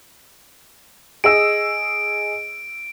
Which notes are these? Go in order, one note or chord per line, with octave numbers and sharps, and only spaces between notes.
G#4 D#5 E6 D7